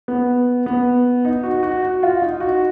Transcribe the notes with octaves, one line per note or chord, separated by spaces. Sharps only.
B3
B3
D#4
F#4
F#4
F#4
F4
D#4
F#4